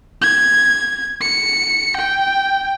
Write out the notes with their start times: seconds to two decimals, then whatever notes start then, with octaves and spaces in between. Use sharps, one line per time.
0.22 G#6
1.21 C#7
1.97 G5